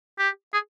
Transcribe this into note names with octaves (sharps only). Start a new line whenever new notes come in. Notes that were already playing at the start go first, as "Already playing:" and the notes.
G4
G#4